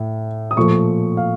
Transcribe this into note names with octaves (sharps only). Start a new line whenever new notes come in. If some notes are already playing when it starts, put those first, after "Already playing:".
Already playing: A2
D#6
A#2 F3 A3 C#6
F5